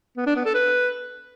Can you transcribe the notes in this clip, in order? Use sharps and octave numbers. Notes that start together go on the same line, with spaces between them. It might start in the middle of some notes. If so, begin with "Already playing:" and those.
B3
D4
B3
A4
B4